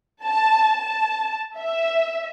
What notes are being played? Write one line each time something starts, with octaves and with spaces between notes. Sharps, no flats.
A5
A5
E5